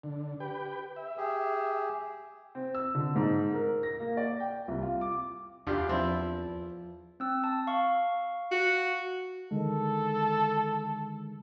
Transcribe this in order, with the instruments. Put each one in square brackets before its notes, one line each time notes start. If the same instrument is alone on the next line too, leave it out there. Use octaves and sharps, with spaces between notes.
[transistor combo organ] D3
G4 B4 G5
E5
[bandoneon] G4 G#4
[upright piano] C4
E6
D3
G#2
A#4
A#6
A#3
D5
G5
C2
F4
D6
[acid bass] E2 [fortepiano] D4 F4 G4
[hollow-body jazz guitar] F3 [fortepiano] C4 E4
[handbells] C4 E6
A5
F5 C#6
[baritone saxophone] F#4
[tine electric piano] D3 D#3 G#3 [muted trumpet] A4